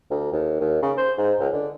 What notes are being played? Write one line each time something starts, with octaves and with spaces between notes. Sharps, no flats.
D2
D#2
D#2
C#3
C5
G#2
C#2
D3